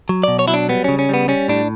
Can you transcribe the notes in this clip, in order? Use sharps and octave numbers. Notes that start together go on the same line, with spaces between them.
F#3
B2 D5
C#5
F#3 E4
D4
G3 B3
C#3 C#4
C#4
G3 B3
G3 C#4
A2 D4